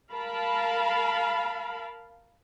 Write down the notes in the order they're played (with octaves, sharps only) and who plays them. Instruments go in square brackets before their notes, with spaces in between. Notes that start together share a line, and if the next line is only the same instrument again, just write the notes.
[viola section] A#4 F5 A5 B5